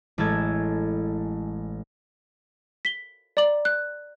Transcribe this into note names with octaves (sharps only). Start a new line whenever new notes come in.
A1 G#3 A4 G#6
B6 G7
D5 A#5 D6 F#7
F#6